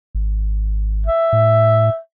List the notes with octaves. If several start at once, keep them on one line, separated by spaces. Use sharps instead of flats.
G#1
E5
A2